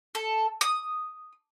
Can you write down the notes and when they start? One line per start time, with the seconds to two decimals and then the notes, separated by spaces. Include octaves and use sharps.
0.15 A4
0.61 D#6